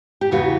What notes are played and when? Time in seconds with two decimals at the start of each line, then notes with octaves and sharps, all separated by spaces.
0.21 G4
0.31 E2 C#3 E3 F#4